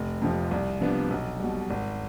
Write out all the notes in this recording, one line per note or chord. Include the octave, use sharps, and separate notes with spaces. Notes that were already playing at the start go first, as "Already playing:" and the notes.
Already playing: F1
F2 C3 F3
C2
C3 F3 B3 D4
B1
B2 G3
G#1